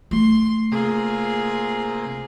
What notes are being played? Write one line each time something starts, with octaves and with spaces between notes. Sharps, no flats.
A3 C6
C3 A#3 F4 G#4